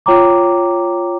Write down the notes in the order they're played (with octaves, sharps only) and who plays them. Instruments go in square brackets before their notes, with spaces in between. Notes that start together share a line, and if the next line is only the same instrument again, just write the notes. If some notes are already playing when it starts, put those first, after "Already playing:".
[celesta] F4 C#5 G5 A#5 D6